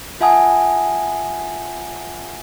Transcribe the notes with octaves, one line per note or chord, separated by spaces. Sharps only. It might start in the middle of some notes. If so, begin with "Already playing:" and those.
F4 E5 F#5 G#5 A5 D#6